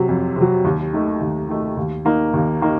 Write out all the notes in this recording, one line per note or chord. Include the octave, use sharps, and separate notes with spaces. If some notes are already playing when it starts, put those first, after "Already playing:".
Already playing: C3 F#3
F2
C3 F#3
D#2
D#3 A3 D#4
D#2
D#3 A3 D#4
D#2
D#3 A#3 D#4
D#2
D#3 A#3 D#4